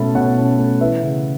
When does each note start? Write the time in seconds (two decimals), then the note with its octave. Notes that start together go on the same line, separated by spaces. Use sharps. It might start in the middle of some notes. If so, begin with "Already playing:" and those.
Already playing: B2 A3 C#4 E5 A5 B5
0.15 B2 C#5 F#5
0.37 C#4
0.59 A3
0.81 E3 B4 E5
1.03 C#3